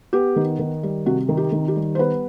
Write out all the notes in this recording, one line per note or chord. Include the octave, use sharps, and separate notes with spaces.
B3 G4
D#3
D#3
G3
C3 F#4
D#3
G4
D#3
G4
G3
C5
B3 B4